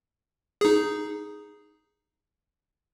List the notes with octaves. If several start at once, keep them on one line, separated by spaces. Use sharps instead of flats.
D#4 G#4